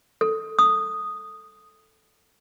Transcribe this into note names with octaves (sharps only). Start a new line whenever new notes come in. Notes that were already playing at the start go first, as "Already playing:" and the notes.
A4
D#6